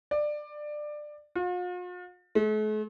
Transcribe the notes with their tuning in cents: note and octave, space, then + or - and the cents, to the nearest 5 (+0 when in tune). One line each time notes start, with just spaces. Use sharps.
D5 +20
F4 +45
A3 -45